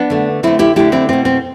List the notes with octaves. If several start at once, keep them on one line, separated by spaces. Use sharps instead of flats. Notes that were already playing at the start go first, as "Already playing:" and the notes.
Already playing: B3 D4
D3 A3
D3 A3 C4 E4
E4 G4
D3 A3 E4 G4
C4 E4
B2 A3 C4
C4